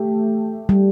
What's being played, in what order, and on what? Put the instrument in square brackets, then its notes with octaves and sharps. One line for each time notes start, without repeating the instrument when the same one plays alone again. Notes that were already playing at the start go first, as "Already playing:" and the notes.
Already playing: [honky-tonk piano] A3 G4
[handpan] G3